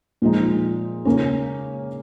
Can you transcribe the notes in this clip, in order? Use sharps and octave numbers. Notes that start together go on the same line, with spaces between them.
A#2 F3 G#3 D#4
C#3 A#3 C#4